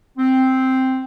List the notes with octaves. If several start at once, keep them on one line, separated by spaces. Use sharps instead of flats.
C4